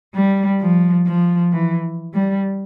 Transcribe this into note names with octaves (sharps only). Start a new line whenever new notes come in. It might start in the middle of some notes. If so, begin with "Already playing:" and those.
G3
F3
F3
E3
G3